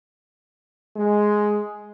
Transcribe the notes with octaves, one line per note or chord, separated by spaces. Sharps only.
G#3